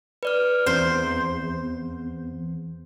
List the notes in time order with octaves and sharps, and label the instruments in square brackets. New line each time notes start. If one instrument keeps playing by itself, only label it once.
[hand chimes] B4 D5 F6
[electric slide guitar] E2 [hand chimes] C4 [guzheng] C5